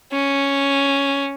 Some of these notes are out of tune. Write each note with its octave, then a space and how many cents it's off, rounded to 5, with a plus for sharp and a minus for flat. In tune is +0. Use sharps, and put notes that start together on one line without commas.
C#4 +0